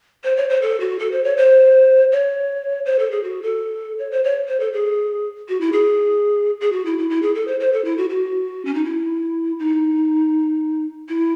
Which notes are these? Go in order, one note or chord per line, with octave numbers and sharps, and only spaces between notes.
C5
C#5
C5
A4
F#4
A4
C5
C#5
C5
C#5
C5
A4
G#4
F#4
A4
C#5
C5
C#5
C5
A4
G#4
F#4
E4
G#4
G#4
F#4
E4
E4
E4
G#4
A4
C5
C5
A4
E4
F#4
F#4
C#4
D#4
E4
D#4
E4